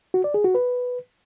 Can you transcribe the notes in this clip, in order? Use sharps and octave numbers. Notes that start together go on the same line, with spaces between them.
F#4
D5
G#4
F#4
B4